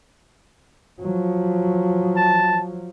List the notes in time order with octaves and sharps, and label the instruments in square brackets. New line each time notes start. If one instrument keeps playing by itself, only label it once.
[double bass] F3 F#3
[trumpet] A5